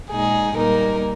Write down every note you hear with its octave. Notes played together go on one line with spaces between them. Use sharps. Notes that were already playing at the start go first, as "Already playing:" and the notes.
A#2 G#3 D#4 G#4
A#2 G3 A#3 D#4 A#4